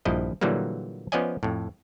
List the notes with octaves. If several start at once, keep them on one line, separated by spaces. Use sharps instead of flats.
A#1 G2 F3 E4 D#5
A#2 D3 E3 F#3 G3 A#3
F3 B3 C#4 D5 D#5 G#5
F2 A2